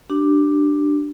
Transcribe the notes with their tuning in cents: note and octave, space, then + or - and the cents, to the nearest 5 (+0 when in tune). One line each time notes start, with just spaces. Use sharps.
D4 +10 G4 -25